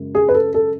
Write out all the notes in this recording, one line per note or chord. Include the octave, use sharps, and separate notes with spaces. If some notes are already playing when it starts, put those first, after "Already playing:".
Already playing: F#2 C#3 G#3
G#4
B4
A4
A4